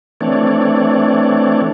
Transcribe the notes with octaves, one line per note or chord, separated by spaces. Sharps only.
E3 A3 C4 D4 C#5 D5